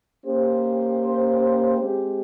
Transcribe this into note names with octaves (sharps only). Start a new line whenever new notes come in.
A#3 C#4 G4 C5
G#3 C4 G4